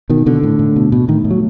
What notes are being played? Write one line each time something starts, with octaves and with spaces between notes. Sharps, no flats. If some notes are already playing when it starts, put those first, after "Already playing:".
B2 D#3
B2 D3
A2
A2
B2
B2
A2 D#3
A2
F#3